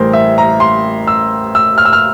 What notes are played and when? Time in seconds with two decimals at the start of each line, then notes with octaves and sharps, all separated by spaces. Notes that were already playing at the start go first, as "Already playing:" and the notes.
Already playing: A1 A2 E3 G3 A#4 C5
0.13 E5
0.38 A#5
0.60 C6
1.07 E6
1.55 E6
1.78 F6
1.85 E6
1.93 F6